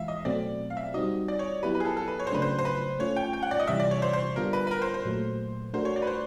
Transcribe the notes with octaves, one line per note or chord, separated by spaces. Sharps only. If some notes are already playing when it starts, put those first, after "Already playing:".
Already playing: E3 G#3 E5 F5
D#5
B2 F#3 A3 C4 D5
F5
E5
G3 C4 D#4 F#4 D#5
D5
C#5
F#3 B3 E4 G4 B4
B4
G#4
A4
A4
B4
C#5
C5
C#3 F#3 A3 D4 B4
C5
C5
B4
A3 C#4 F4 C#5
G5
G5
F#5
D5
D#5
C3 E3 G3 E5
D5
C#5
C5
C5
D3 G3 B3 D4 F4 A#4
B4
B4
A#4
C5
C5
A#2 F#3 A3
A3 D4 F#4 A#4 C5
C#5
D5
B4
C5